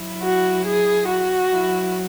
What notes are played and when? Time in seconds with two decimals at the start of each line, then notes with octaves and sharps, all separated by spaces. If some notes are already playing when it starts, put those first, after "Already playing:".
Already playing: F#3 E4
0.23 F#4
0.65 G#4
1.07 F#4
1.49 F#3 E4